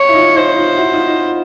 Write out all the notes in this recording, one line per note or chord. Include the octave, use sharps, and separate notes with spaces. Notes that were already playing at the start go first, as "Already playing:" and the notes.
Already playing: C#5
E4
D#4 F4
D#4 F4 C5
D#4 F4
E4 F#4
D#4 F4
D#4 F4